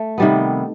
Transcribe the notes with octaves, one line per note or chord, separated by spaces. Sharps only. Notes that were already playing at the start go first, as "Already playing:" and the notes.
Already playing: A3
C3 D#3 G3 B3